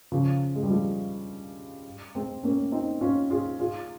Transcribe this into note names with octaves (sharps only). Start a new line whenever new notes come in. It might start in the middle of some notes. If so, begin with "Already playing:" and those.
C#3 F3
G#3
G3
F3 G#3
G#3 C4
A#3 C#4
C4 D#4
C#4 F4
F4 G#4
F4 G#4